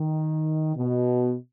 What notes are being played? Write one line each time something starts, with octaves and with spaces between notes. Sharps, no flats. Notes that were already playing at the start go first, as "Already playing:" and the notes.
Already playing: D#3
B2